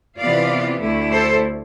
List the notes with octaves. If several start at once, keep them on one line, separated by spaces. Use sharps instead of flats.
C3 E3 B3 F4 D5 F5
D2 D3 A3 E4
A4 C5